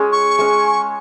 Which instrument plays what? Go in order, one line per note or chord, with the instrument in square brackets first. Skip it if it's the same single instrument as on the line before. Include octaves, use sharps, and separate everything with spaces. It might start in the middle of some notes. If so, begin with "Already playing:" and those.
Already playing: [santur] G#3 C#4 G#4
[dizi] C#6
[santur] G#3 C#4 G#4